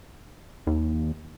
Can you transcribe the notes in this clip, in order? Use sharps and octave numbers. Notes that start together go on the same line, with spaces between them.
D#2